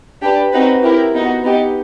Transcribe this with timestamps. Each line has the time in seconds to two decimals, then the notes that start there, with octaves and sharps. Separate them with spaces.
0.22 D4 G4 B4
0.53 C4 D#4 F#4 B4
0.83 E4 G4 A#4
1.14 B3 D#4 F#4
1.43 B3 D#4 G4